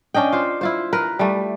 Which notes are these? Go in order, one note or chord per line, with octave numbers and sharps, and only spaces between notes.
C#4 D4 D#5 G5
F4 C5
E4 F4 C5
A#4 B4
G3 A3